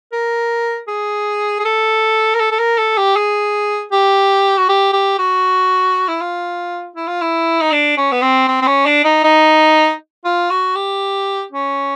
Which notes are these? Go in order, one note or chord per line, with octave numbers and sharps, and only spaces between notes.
A#4
G#4
G#4
A4
A#4
A4
A4
A#4
A4
G4
G#4
G4
F#4
G4
G4
F#4
E4
F4
E4
F4
E4
D#4
D4
C#4
B3
C4
C4
C4
C#4
D4
D#4
D#4
F4
F#4
G4
C#4